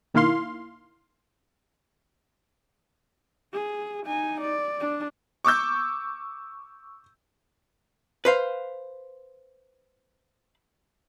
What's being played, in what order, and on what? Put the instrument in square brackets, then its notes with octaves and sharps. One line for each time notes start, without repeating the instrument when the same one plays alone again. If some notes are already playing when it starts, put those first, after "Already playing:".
[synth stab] B1 D#3 A#3 E4 F5 C6
[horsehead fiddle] G#4
D#4 G#5
D5
D4
[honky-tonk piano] C#6 D6 E6 G6
[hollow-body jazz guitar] B4 C5 F5